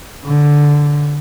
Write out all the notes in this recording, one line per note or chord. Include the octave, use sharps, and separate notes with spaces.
D3